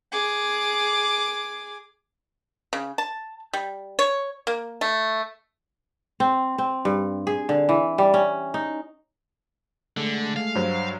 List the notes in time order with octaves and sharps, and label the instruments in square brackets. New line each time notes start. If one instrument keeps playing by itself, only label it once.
[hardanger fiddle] G#4 D6
[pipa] C#3
A5
G3
C#5
A#3
A3
[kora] C4
C4
G2
G#4
D3
E3
G3
C#4
D#4
[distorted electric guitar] D3 [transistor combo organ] G#3 A3
[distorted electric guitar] F5
[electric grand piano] G2 F#3 C5